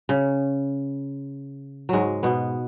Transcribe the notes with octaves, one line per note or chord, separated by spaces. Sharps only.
C#3
G#2 F#3 G#3
B2 B3